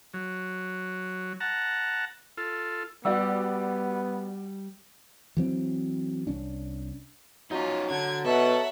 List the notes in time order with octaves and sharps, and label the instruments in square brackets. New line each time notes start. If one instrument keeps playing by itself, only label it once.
[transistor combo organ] F#3
F#5 A5 A#5
F4 A4
[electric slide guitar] G3 G4 [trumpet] B3 [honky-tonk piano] F#4 D5 [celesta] E6
[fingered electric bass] E3 F#3 C4
C2 C#4 D4
[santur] F#3 [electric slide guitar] C#4 D#4 [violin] F4
[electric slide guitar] D3 [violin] G#6
[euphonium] B2 [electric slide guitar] A4 [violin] E5 F#5